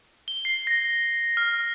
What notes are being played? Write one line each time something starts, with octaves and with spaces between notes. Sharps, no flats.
G7
C7
A#6
F6